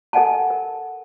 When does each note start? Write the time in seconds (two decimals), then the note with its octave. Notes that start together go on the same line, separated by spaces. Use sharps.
0.13 A4 A#4 D#5 F#5 G#5 A5
0.50 A#4